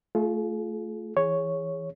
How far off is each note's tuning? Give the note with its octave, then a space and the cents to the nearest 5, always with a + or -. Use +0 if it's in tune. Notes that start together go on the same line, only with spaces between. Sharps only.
A3 +0 F4 +0 G#4 +45
E3 +0 G#4 -10 C#5 +0